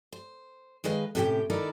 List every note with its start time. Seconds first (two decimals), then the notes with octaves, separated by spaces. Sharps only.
0.12 C5
0.84 D#3 G#3 B4 D#5 F5
1.15 A2 C3 G3 C#4 G4 G5
1.50 D#3 D#4 E4 A4 A#4 D5